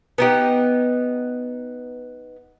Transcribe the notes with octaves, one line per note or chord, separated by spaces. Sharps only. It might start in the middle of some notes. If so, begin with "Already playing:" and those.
B3 D#4 G4